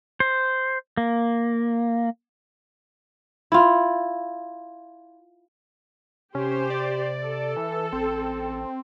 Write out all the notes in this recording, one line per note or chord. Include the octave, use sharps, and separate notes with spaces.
C5
A#3
E4 F4
C3 C#4 G4 C5
D5
A4
E3
A1 C4